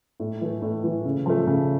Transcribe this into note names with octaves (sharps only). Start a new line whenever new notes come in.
A2
E3 A3
A2
E3 A3
C#3
F3 A3
C#3